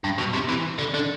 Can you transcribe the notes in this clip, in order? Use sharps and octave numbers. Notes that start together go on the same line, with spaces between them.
G2
B2
C3
E3
D3
D3